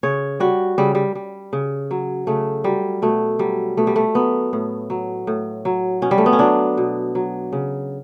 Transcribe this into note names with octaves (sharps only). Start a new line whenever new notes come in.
C#3 C#5
G3 F#4
C#3 G3
G3
G3
C#3
F#3
C#3 A3
F#3 G3
B2 A3
F#3 G3
B2 A3
G3
A3
F#3 B3
A2
F#3
A2
F#3
B2 C#4
G3
A3
B3
C#4
F#3 D4
B2
F#3
C#3